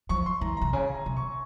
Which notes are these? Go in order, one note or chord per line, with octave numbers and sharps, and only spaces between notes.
F3 C#6
C6
E3 A#5
A#5
C3
C#3 G#5
A#5
C3
C#6